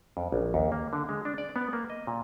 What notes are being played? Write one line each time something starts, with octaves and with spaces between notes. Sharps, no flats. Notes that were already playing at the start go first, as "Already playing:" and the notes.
F2
A#1
D#2
A#3
D3
G#3
D4
D5
B3
A#3
D#5
A#2